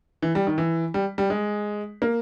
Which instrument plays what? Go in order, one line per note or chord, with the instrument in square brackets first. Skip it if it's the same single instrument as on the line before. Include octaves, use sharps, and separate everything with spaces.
[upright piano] E3
G3
D#3
E3
G3
G3
G#3
A#3